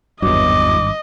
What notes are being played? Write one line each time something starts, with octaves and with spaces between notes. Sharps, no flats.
G#1 E2 G2 F#3 D#5 D6